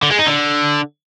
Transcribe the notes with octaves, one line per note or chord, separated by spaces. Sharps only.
D3
G#3
D#4
D3